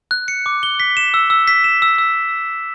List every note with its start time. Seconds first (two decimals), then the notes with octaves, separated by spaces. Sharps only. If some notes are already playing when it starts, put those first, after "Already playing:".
0.11 F#6
0.28 C#7
0.46 D6
0.63 G7
0.80 B6
0.97 E7
1.14 E6
1.30 E6
1.48 B6
1.64 E7
1.82 E6
1.98 E6